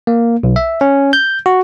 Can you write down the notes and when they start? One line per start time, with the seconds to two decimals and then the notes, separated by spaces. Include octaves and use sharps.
0.07 A#3
0.43 B1
0.56 E5
0.81 C#4
1.13 G6
1.46 F#4